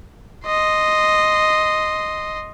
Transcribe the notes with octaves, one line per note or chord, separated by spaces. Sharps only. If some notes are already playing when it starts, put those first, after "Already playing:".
D#5 C6